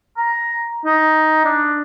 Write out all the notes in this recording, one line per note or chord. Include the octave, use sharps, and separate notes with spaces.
A#5
D#4
D4